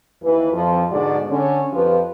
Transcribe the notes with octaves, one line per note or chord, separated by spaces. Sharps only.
D#2 E3 B4
F2 F3
G#2 B2 D3 G#3 F#4 D5
D3 C#4 C#5
F2 F3 G4 B4